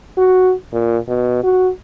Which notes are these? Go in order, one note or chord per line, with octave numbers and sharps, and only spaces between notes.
F#4
A#2
B2
F#4